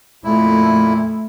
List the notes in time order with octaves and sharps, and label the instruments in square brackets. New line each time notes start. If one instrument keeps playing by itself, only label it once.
[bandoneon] F2 A#2 E4 [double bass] A3